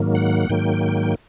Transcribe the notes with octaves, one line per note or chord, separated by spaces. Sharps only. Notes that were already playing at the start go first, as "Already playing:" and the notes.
Already playing: G#2 D#3 F#3 A#3
F#5
G#2 D#3 F#3 A#3 G5